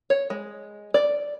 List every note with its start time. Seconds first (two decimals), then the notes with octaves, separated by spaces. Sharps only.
0.10 C#5
0.30 G#3
0.94 D5